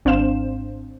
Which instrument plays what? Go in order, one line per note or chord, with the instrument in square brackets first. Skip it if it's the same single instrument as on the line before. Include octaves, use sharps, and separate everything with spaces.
[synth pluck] G#1 C4 D4 C5 F5 E7